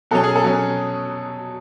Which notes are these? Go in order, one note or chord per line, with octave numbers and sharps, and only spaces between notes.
B2 F#3 C#4 A4
G#4
A4
B2 F#3 C#4